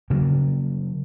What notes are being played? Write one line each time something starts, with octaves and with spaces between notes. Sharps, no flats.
C#3 F#3 G3 A#3